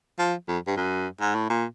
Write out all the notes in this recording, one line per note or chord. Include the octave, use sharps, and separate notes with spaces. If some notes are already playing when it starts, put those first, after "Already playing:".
F3
F2
G2
F#2
G#2
A2
A#2